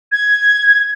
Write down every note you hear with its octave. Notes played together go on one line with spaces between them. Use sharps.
G#6